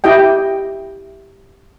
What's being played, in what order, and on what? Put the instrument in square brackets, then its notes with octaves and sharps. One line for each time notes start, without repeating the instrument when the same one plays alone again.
[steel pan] E4 G4 D#5 G5